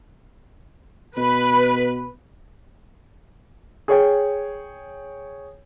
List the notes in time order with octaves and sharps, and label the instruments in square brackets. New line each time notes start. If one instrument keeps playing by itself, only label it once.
[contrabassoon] B2 [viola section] B4
[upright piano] G#4 C#5 G5